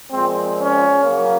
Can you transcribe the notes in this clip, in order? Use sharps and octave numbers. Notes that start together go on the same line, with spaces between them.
A#2 F3 G#3 C4
C#4
F#2 C#3 F#3 A#3